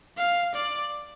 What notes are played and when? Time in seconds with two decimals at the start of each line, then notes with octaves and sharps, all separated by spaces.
0.18 F5
0.54 D5